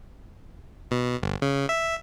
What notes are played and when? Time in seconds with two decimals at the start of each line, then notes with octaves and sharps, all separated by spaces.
0.91 B2
1.23 G1
1.42 C#3
1.69 E5